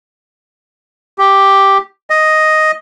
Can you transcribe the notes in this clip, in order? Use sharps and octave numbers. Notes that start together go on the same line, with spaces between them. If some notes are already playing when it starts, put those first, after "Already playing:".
G4
D#5